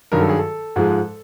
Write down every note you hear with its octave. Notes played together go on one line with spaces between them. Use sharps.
G2 D#3 F#3 A#4
A4
G#4
A4
G#2 F3 G#3